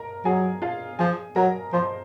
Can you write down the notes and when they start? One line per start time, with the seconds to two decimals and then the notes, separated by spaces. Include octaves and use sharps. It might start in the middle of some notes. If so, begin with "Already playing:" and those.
Already playing: A#4 A#5
0.25 F#3 G#4 G#5
0.62 F4 F5
0.99 F3 G#4 G#5
1.36 F#3 A#4 A#5
1.73 F3 C5 C6